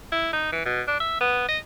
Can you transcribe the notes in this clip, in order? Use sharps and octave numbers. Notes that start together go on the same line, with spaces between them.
E4
D#4
E3
B2
D4
E5
B3
D#5